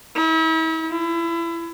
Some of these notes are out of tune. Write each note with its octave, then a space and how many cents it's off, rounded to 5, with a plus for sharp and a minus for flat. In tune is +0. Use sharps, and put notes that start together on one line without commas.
E4 -40
E4 +30